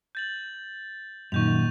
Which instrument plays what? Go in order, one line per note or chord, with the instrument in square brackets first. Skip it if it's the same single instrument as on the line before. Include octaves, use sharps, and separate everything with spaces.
[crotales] G6 A6 F#7
[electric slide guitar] F#2 D#3 [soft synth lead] A#2 [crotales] C#6 G6 F7